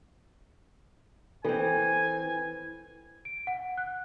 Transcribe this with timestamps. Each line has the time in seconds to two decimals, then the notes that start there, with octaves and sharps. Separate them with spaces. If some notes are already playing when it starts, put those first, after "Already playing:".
1.45 E3 C4 A4 G#5
3.25 D7
3.47 F#5
3.78 F#6